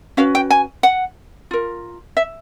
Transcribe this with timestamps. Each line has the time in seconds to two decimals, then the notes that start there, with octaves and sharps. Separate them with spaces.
0.17 C#4 F#4 B4 F5
0.35 G5
0.50 G#5
0.83 F#5
1.51 F4 A#4
2.17 E5